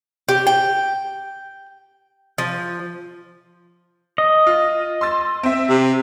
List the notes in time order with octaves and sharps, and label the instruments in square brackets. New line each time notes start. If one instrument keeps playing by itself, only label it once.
[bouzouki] G4
G5
F3
[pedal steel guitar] D#5
[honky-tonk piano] F4
C6 E6 A6
C4 E5
[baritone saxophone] C3